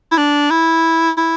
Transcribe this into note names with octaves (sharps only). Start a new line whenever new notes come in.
E4
D4
E4
E4